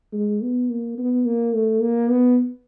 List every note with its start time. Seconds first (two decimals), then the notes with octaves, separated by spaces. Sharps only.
0.12 G#3
0.42 B3
0.70 A#3
0.98 B3
1.25 A#3
1.54 A3
1.81 A#3
2.10 B3